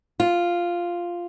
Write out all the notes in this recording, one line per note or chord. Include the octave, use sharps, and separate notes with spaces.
F4